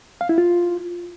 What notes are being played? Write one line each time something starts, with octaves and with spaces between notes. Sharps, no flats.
F5
E4
F4